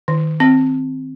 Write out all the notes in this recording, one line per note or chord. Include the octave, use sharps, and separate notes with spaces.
D#3
C4